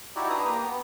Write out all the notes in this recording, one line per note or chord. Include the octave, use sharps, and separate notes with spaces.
D#4 E4 F#4 G4 D5 E5
D4 B4 A#5 D#6
A#3 G4 A#5
B3